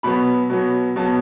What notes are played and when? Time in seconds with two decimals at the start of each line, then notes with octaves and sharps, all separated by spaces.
0.03 B2 F#3 B3 B5
0.50 B2 F#3 B3
0.96 B2 F#3 B3 A5